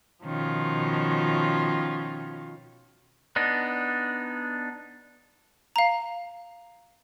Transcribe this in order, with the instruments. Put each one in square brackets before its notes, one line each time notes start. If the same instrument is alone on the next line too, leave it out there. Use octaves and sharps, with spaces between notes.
[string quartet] B2 D#3 F3 C#4 F4
[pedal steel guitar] B3 D4 D#4
[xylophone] F5 A#5